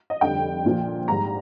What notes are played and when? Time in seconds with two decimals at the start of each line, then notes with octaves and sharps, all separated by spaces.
0.10 D#5
0.21 F1 F2 D3 G3 G5
0.64 A#1 A#2 F3
1.08 G#1 G#2 G3 A#5